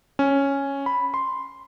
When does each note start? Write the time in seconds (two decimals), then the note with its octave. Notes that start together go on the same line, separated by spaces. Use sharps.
0.19 C#4
0.86 B5
1.14 C6